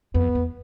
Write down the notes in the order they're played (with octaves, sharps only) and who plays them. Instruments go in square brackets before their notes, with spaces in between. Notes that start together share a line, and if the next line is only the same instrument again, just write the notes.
[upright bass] F2 [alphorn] B3
[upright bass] E2